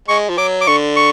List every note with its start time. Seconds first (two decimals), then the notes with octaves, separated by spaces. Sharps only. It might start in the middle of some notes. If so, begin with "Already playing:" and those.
0.08 G#3 C#6
0.29 F3
0.38 F#3 D6
0.61 D6
0.67 D3 C#6
0.96 C#6